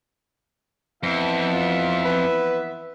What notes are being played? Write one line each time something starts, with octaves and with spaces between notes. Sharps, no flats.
F2 E3 B3 E5
F4
B4